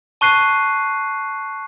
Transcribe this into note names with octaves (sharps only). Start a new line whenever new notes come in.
A5 C#6 F#6 C7 D#7